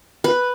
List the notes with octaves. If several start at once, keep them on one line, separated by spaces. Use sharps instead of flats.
B4